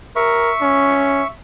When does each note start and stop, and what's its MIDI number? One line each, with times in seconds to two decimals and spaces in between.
0.16 0.52 70
0.16 1.27 76
0.16 1.27 85
0.61 1.22 61